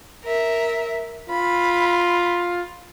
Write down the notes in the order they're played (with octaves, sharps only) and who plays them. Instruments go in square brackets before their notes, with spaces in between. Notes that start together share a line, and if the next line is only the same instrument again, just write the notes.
[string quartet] A#4 E5
[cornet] F4 [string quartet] B5